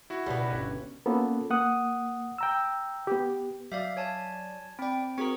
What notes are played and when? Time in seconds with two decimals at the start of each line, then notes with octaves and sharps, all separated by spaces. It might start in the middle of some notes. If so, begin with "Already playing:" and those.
0.10 E4 F#4
0.26 C#2 B2 G3 B4
0.50 G1 C#4
1.06 A#3 B3 C#4 F4 A4
1.50 A#3 F#5 D#6
2.38 G5 A#5 E6
3.07 B3 G4
3.72 F#3 D5 E5 F5
3.97 C#5 G#5 A5
4.79 C4 D5 G5 B5
5.18 C4 F#4 G#4 A#4 C#6